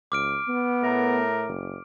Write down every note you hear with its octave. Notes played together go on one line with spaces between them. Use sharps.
C#2 D6 F6 D7
B3
A2 A3 A#4
F#1